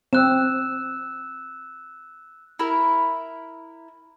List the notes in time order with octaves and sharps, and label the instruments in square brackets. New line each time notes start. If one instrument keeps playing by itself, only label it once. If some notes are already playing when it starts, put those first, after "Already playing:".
[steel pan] C4 [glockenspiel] E6 F#6 E7
[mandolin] E4 A#4